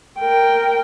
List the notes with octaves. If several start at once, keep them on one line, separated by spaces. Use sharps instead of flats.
A#4 G5